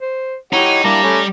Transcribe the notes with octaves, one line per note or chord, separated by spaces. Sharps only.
C5
D#4 E4 G4 C#5 F#5
G3 A#3 D4 E4 A#5
A3 C#4